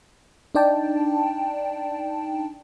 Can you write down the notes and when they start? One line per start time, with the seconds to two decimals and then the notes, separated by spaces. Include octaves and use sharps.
0.55 D4 D#4 D5 G5 A5